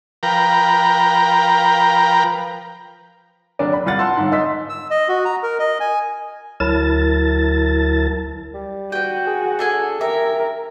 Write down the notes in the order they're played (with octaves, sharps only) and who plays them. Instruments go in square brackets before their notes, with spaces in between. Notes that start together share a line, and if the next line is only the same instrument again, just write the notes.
[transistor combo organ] F3 A#4 B4 G5 A#5
[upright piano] F#1 D3 D4 D5
B5
C2 F4 F#5 A6
F#5 A5 C6 E6
G1 G#2
D#5 C6 D#6 E6 B6
[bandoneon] E6
D#5
F#4
A#5
A#4
D#5
G#5
[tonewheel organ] D2 F#3 E4 A#4 A5 A6
[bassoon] G3
[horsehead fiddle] F#4 [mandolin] B4 G5
[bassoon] G#4
[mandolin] D4 A4 G#5
[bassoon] G4 [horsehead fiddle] A#4 [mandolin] E5